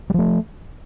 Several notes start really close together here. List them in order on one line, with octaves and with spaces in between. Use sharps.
G3 F3 A3